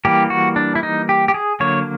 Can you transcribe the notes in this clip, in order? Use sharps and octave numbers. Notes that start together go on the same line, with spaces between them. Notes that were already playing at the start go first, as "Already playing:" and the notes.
E3 G3 A#3 G4
F#4
D4
E4
D#4
G4
G4
G#4
D3 F#3 A#3 C#5